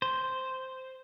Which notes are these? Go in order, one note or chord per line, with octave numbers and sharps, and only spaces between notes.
C5